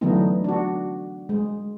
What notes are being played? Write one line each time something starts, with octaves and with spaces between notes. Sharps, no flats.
D3 E3 F#3 A3 B3 D#4
D4 F#4
G#3